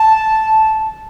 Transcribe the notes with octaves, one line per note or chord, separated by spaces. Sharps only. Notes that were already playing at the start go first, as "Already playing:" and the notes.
Already playing: A5